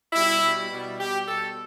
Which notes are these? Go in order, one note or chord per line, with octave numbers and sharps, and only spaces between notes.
B2 G3 E4
B2 G3
B2 G3
B2 G3 G4
B2 G3 A4